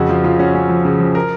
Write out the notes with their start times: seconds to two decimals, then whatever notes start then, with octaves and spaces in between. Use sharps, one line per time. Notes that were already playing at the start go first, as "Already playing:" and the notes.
Already playing: F2 C#3 F#4
0.09 F3 F4
0.24 C#3 F4
0.39 C#4 F#4
0.55 C#4
0.69 F3
0.85 C#3
1.00 F3
1.15 A#4